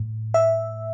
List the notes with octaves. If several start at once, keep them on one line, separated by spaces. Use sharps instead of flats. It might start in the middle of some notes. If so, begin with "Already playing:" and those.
Already playing: A2
E5